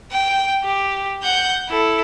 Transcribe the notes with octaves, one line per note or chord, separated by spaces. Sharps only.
G5
G4
F#5 G6
E4 A4